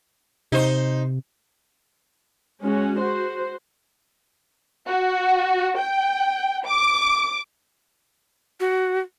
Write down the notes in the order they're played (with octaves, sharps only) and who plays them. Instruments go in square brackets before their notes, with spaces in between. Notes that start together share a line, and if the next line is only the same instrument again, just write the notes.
[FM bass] C3 [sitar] D#4 C5
[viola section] G#3 C#4 F#4
F#4 C5
[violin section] F#4
G5
D6
[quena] F#4